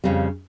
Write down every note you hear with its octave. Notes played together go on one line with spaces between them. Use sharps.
F2 C#3 G3 C4